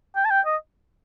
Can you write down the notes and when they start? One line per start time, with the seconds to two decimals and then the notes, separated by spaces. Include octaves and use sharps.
0.16 G5
0.25 A5
0.30 G5
0.46 D#5